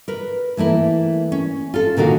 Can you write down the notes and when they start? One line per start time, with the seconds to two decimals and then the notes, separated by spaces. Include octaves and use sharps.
0.08 A#4 B4
0.57 E3 A3 A#3 E4
1.32 C#4
1.74 F4 A4
1.97 A#2 D3 D#3 F#4 F5